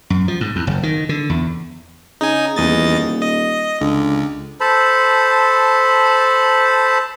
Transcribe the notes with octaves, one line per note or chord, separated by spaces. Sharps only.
F#2
F3
G#2
E2
F#1
D#3
D3
E2
C#3 D#4 G#5
D#1 E2 D#5 A6
D#5
C#2 D3
A4 C5 A5 B5